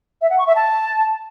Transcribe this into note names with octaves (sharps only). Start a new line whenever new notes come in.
E5
F#5
C#6
E5
A5